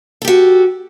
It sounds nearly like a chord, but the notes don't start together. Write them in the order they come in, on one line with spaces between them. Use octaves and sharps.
A4 G4 F#4